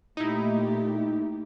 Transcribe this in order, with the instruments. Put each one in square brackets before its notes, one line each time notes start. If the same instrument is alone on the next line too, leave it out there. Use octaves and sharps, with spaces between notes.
[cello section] A#2 A3 G4 [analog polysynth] D#4 E4